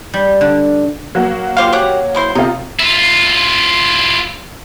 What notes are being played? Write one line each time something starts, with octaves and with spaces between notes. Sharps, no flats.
G3
D3
F#3 A#3 F#4
F4 G4 C5 F5
C#4 G4 C#5 F#5
G#3 E4 C5
C3 D#4 F4
E4 F4